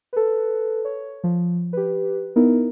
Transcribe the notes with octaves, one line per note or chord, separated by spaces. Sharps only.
A4 B4
C#5
F3
G4 B4
B3 D#4 E4 A#4